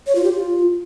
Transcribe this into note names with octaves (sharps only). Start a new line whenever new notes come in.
C#5
F4
G4
F4